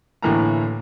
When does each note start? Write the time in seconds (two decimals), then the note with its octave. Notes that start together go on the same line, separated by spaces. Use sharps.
0.22 D2 A2 E3 A#3 A#5